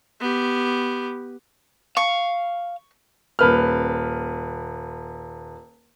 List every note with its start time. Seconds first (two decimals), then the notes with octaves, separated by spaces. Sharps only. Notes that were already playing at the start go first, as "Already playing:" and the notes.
0.20 B3 G4
1.97 F5 C#6
3.39 D#1 B4 F6